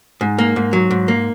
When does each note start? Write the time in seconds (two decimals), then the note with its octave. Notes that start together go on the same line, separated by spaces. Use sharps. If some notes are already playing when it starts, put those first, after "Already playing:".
0.21 G#2
0.38 A#3
0.56 G#2
0.73 F#3
0.91 G#2
1.08 A#3